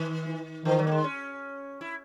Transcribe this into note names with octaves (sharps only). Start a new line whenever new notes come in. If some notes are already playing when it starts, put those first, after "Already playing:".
Already playing: D#3
E3
D#3 E3
F#3
A#3
G#3
C#4
E4